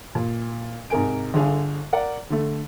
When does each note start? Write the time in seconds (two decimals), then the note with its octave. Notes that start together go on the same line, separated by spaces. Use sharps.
0.15 A#2
0.90 G#2 C3 A#4 G#5 D7
1.34 G1 D3 G#4 F5
1.93 A#4 D5 F#5
2.30 D3 A3